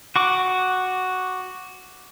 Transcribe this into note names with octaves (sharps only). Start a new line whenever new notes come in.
F#4 C#6 D6